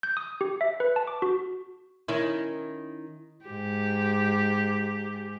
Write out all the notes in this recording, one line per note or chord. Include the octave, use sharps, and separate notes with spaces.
G6
D#6
G4
E5
B4
A5
D6
F#4
D#3 C#4 E4
G#2 G4